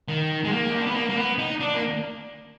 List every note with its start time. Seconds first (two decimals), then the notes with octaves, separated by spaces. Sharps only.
0.08 D#3
0.44 G#3
0.52 A#3
0.71 D#4
0.79 D4
0.86 B3
0.95 A#3
1.09 A#3
1.16 B3
1.38 D#4
1.60 D4
1.74 A#3